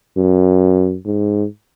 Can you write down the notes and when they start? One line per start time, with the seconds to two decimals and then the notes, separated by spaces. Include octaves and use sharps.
0.17 F#2
1.05 G#2